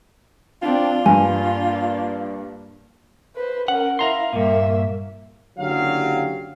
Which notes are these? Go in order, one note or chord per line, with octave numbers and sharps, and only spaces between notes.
C4 D4 F4
G2 A#3 D4 G#5
B4 C5
C#4 A#4 F#5
E4 A#4 F5 A#5 C6
G2 A#2 A#3 E5
F#1 D3 F#3 G4 F5